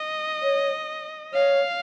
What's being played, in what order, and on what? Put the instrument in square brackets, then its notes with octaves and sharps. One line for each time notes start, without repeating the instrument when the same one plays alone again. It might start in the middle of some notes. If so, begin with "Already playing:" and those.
Already playing: [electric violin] D#5
[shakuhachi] C#5
[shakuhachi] C#5 [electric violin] F5